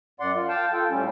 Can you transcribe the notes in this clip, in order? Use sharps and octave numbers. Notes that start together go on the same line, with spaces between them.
F#2 D5 F#5 C6
F4
F5 G5 A5
F4 A4 G5
A2 G3 C#4